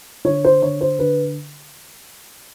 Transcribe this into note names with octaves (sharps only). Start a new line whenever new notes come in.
D3 C#5
C5
D3 C#5
C5
D3 B4